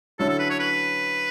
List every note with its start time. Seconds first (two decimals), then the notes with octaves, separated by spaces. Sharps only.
0.19 D3 F#3 C#4 E4 A4
0.29 A4
0.39 B4
0.50 C#5
0.60 B4